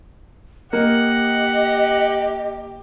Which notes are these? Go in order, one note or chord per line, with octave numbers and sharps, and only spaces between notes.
A#3 G4 D#5 F#5